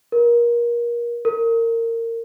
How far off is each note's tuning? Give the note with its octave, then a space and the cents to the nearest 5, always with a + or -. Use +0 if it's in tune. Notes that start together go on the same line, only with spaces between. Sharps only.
A#4 +25
A#4 -25